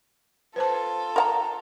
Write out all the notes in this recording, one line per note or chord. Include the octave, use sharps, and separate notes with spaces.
F4 A4 B4 C5 A5
A#4 F#5 A#5